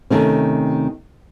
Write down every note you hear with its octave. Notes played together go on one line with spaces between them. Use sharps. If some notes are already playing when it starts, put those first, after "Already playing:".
C3 D#3 A3 C#4